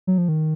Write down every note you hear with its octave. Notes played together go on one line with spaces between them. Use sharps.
F#3
F3
D#3